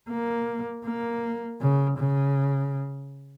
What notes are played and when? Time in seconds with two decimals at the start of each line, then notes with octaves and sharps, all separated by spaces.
0.10 A#3
0.86 A#3
1.61 C#3
1.99 C#3